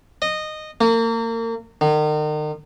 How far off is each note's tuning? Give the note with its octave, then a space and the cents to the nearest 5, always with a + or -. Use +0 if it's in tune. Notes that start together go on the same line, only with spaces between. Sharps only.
D#5 -15
A#3 -35
D#3 -40